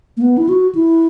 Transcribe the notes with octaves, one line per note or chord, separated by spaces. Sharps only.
A#3
B3
E4
F#4
E4